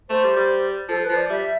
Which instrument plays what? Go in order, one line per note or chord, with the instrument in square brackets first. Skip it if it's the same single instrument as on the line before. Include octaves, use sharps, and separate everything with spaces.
[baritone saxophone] A3 [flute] C5
[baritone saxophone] G3
G3
[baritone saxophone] F3 [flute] A4
[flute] B4
[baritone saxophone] F3
[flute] D5
[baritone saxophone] G3 [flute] E5